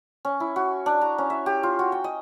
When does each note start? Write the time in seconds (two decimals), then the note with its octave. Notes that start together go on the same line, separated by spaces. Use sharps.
0.25 C#4
0.40 E4
0.56 F#4
0.86 D4
1.01 A#5
1.18 C#4
1.30 E5
1.46 G4
1.63 F4
1.79 F#4
1.92 G5
2.04 D#5